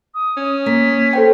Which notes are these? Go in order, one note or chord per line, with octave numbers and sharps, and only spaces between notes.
D#6
C#4
A#3 B6
A4 C5 G5